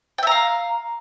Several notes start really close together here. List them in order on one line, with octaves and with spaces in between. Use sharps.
G5 E5 A#5 F5